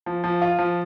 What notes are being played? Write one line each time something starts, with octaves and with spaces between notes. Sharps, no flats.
F3
F3
F4
F3